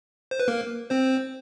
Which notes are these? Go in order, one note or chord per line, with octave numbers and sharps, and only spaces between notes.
C5
B4
A#3 A#4
C4 C5